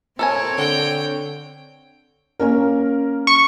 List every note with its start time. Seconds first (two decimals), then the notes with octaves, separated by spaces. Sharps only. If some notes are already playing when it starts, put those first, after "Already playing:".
0.19 C4 A4 A#4 C#5 G#5
0.58 D3 G5
2.40 A#3 C#4 A#4
3.27 C#6